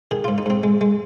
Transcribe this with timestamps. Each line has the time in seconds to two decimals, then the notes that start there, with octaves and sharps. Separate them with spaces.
0.11 D#3 G#4
0.24 G#2 F4
0.38 D#4
0.46 G#2 C4
0.63 G#3
0.81 G#3